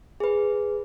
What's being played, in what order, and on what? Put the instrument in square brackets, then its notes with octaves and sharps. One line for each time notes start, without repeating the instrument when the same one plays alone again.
[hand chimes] G#4 B4